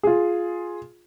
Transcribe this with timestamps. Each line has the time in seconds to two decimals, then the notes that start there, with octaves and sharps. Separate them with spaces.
0.03 F4 G#4